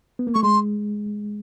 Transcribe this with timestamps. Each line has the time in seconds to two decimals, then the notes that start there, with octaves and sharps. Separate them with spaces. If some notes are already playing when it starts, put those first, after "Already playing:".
0.19 B3
0.27 A#3
0.34 A3 C#6
0.43 G#3 C6